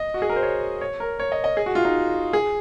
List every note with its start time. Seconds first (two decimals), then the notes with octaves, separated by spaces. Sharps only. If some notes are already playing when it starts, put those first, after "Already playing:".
Already playing: D#5
0.14 F#4
0.22 G#4
0.29 A#4
0.36 C5
0.43 C#5
0.81 C#5
1.00 A#4
1.20 C#5
1.32 D#5
1.44 D#5
1.57 G#4
1.66 F#4
1.75 F4
1.85 D#4
2.33 G#4